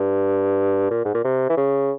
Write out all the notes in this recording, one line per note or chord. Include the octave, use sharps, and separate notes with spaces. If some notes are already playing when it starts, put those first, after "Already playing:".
Already playing: G2
A#2
G#2
A#2
C3
E3
C#3